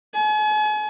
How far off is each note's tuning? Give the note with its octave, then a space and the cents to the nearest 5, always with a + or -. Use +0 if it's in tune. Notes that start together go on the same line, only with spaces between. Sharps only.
G#5 +40